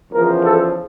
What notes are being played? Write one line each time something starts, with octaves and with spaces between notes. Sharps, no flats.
E2 C#3 F3 A#4
A4